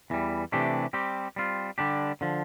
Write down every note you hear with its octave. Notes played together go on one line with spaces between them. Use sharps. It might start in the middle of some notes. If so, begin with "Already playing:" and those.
E2 E3 G3
C3 E3 A3 D4 G4
G3 C4 G4
G3 C4 F4
D3 G3 D4 G4
D3 F3